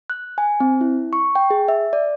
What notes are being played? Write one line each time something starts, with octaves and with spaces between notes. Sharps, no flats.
F#6
G#5
C4
E4
C#6
G5
G#4
E5
D5